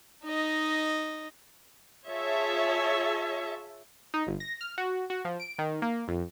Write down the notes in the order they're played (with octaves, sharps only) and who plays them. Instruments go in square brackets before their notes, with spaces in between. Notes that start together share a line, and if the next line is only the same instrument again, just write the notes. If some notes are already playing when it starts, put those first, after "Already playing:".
[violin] D#4 D#5
[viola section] F4 G#4 C#5 E5 A5
[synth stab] D#4
G1
A#6
F6
F#4
F#4
F3
D7
D#3
A#3
F2